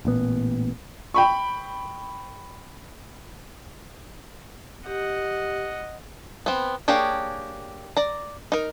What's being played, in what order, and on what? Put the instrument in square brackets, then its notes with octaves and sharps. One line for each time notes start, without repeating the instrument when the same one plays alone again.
[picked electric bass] A1 A#2 B3
[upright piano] G5 B5 C#6
[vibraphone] G4 [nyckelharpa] D#5 F#5
[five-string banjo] B3 C4
A#3 D4 G4 G#4 C#5
D5 A#5
D#4 A#4